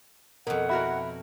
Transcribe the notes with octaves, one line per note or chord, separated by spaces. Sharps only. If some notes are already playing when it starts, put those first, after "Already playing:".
F2 B2 A#4 F#5
E4 F#4 A#4 E5 B5